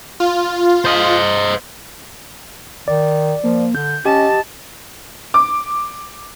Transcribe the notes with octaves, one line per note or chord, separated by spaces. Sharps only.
F4
C5 D#5
D#3 D5
F3 A#3
D3 G6
C#4 G4 D#5 A5
D6